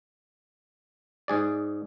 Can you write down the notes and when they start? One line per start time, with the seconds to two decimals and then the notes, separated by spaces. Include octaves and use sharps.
1.28 G#2 G#4 D5